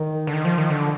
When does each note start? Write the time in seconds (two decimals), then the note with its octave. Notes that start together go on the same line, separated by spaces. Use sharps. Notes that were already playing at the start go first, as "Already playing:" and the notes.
Already playing: D#3
0.27 D3
0.34 D#3
0.45 F3
0.58 D#3
0.70 D3